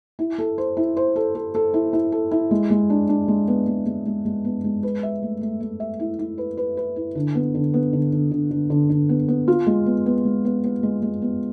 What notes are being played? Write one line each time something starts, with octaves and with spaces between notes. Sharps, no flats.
E4
A4
C5
E4
C5
A4
A4
A4
E4
E4
A4
E4
G#3
G#3
D4
D4
G#3
B3
G#3
G#3
G#3
G#3
B3
G#3
B4
E5
A3
A3
A3
E5
E4
E4
B4
B4
B4
E4
D3
B3
D3
B3
D3
D3
D3
D3
D3
D3
B3
B3
F4
G#3
B3
B3
G#3
B3
B3
G#3
G#3
B3